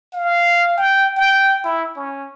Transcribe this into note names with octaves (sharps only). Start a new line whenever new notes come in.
F5
G5
G5
E4
C#4